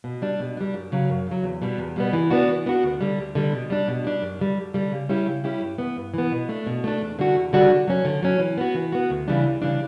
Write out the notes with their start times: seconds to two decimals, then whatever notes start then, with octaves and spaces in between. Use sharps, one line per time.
0.04 B2
0.22 G3 D4
0.40 B2
0.57 G3 D4
0.74 F#2
0.92 C#3 F#3
1.09 F#2
1.27 C#3 F#3
1.43 E2
1.62 B2 G3 B3
1.78 E2
1.96 B2 G3 B3
2.13 E3
2.30 B3 D4 F#4
2.48 E3
2.66 B3 D4 F#4
2.83 D2
3.01 D3 G3
3.18 D2
3.35 D3 G3
3.52 B2
3.70 G3 D4
3.88 B2
4.04 G3 D4
4.22 F#2
4.39 D3 G3
4.58 F#2
4.74 D3 G3
4.92 C#3
5.09 G3 C#4 E4 G4
5.26 C#3
5.44 G3 C#4 E4 G4
5.61 G2
5.78 E3 B3
5.97 G2
6.14 E3 B3
6.32 B2
6.49 A3 D4
6.67 B2
6.84 A3 D4
7.01 E2
7.19 D3 G3 D4 F#4
7.35 E2
7.53 D3 G3 D4 F#4
7.70 D3
7.88 F#3 C#4
8.05 D3
8.23 F#3 C#4
8.39 E3
8.58 B3 F#4
8.75 E3
8.92 B3 F#4
9.10 D2
9.28 C#3 E3 G3 D4
9.44 D2
9.62 C#3 E3 G3 D4